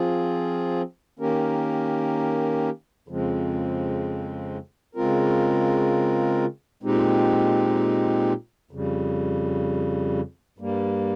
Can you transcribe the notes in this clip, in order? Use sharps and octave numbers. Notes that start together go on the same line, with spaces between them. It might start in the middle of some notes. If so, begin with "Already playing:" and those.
Already playing: F3 C4 F4 G#4
D#3 A#3 C#4 G4 A#4
F2 C#3 F3 G#3 C4
C#3 G#3 C4 F4 A#4
A#2 G#3 C4 D#4 G4
F2 C#3 G3
G2 G3 A#3